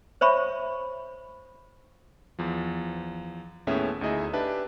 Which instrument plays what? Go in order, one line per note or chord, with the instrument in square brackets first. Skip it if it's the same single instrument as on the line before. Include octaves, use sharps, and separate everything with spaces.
[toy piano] C5 C#5 E5 B5 C#6
[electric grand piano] E2 F3
D#2 A2 B3 C#4 G#4 E5
D2 D#4 E4 G#4 D#5 E5
D4 G4 B4 E5 A5